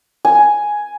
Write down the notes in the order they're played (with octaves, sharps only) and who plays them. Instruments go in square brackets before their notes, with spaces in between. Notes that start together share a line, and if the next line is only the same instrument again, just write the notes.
[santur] G#5